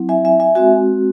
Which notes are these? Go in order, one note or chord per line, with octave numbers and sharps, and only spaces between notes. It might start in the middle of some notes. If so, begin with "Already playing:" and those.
Already playing: F#3 C4 E4
E5 G#5
E5 G#5
E5 G#5
G#3 C4 F#4 E5 G#5